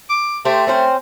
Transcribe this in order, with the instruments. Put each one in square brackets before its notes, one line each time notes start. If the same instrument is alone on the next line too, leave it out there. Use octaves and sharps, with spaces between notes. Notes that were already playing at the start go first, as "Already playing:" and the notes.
[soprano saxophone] D6
[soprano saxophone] A3 [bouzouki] G4 C5
[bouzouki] C4 C#4 C5